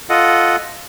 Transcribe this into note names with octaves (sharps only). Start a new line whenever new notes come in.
F4 A4 D#5 F#5